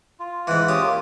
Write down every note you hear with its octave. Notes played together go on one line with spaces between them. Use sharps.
F4
G#2 E3 F#5
C#4 F4 G4 D#6
A#3 F4